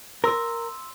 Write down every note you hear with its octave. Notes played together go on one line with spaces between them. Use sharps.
A#4 C6 E6